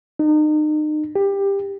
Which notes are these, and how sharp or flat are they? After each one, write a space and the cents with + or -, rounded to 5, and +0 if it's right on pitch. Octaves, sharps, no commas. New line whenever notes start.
D#4 -35
G4 +15